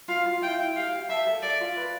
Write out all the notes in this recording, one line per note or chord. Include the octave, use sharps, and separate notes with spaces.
F4 F5
F4
E4 G5
E4
G4 F5
G4
E5 A5
A4
A4 D5
F4
B4